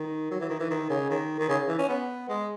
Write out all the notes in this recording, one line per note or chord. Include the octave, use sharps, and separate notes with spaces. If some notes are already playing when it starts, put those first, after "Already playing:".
Already playing: D#3
F#3
E3
D#3
E3
D#3
C#3
D#3
D#3
C#3
E3
C#4
B3
G#3